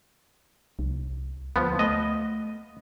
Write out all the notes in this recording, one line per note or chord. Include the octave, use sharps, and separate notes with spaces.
C2
D2 F3 B3
A3 D#5